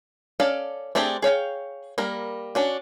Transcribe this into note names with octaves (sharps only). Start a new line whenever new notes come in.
C#4 A4 D5 F5
A3 C4 D4 G4 G#4
G#4 C#5 F5 G5
G3 A#3 A#4
C#4 D4 F#4